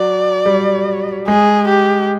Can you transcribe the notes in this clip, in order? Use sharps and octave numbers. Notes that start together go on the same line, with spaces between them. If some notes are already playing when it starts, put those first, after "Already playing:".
Already playing: F#3 D5
G3
G#3 G#4
G4